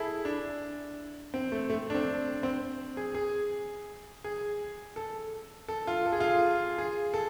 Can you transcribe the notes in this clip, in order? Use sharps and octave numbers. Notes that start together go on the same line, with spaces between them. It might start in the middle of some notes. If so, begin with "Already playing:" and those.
Already playing: E4 G#4 A4
D4
C4
A3
A3
D4
C4
C4
G#4
G#4
G#4
A4
A4
F4
A4
G#4
F4
G#4
G#4
A4